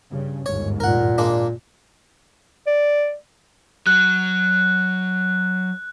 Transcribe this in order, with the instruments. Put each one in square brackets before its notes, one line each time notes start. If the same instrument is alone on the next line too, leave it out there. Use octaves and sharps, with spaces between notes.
[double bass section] G2 C#3
[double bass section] G1 D#2 G#2 [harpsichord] C#5
[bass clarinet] A#2 [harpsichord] A#4 F#5
[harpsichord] G#3 A#3 D4
[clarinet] D5
[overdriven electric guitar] F#3 [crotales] F#6